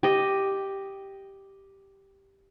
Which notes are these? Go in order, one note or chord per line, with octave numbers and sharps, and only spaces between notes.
G4 D#5